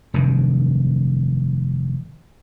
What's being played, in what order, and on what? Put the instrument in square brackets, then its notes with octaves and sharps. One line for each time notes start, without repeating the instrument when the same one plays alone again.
[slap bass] F1 G2 D#3